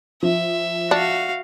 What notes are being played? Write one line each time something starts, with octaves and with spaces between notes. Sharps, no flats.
F3 E5
D4 F#4 F5